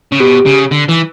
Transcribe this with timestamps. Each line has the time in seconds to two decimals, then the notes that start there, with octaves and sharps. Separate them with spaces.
0.12 C#3
0.20 B2 G4
0.46 C#3
0.71 D3
0.88 E3